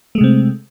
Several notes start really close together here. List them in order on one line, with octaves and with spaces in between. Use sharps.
A3 G#3 C3 C4